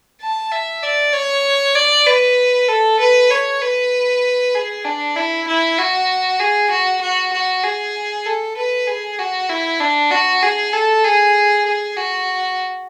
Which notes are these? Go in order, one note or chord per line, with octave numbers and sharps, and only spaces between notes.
A5
E5
D5
C#5
D5
B4
A4
B4
C#5
B4
G#4
D4
E4
E4
F#4
G#4
F#4
F#4
F#4
G#4
A4
B4
G#4
F#4
E4
D4
F#4
G#4
A4
G#4
G#4
F#4